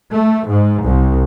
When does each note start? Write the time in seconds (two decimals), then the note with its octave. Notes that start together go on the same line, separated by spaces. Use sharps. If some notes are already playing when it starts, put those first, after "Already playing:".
0.12 A3
0.49 G#2
0.84 C2